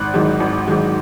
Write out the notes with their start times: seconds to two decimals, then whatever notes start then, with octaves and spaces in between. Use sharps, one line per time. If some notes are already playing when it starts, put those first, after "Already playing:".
Already playing: G#1 F#6
0.14 G#2 D#3 F#3
0.40 G#1
0.67 G#2 D#3 F#3